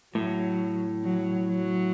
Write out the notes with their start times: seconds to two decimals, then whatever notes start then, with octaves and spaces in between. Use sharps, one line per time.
0.15 A2 F#3
1.04 F#3
1.48 F#3